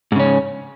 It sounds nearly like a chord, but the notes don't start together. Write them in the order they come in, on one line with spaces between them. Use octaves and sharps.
G#2 C#3 C#4